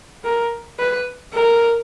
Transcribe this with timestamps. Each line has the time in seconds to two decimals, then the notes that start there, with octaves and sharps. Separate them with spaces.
0.24 A#4
0.79 B4
1.34 A#4